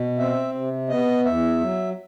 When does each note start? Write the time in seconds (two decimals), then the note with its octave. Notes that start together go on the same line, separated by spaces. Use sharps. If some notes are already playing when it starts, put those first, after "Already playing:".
Already playing: B2
0.18 C4 E5
0.55 C3
0.89 B3 D#5
1.25 E2 E5
1.61 F#3